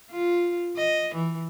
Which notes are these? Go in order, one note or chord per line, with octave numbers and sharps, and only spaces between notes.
F4
D#5
E3